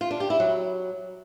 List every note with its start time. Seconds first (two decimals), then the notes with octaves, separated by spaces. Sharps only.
0.01 F4
0.11 D4
0.20 G4
0.30 E4
0.40 F#3